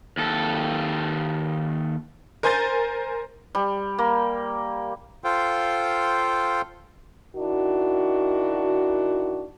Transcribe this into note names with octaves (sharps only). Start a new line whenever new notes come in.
D#2 A4
A#4 C5 G#5 C6 G6 A6
G3
A#3
F4 A4 C5 F5 G5
D#3 D4 E4 F#4